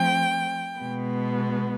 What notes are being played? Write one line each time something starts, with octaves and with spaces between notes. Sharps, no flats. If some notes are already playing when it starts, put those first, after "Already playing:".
Already playing: F3 A3 C4 G5
B2 G#3 B3